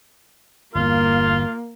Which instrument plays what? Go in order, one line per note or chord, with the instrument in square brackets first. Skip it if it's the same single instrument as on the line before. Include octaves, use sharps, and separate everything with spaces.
[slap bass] G1 E2 [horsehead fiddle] A#3 [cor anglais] F4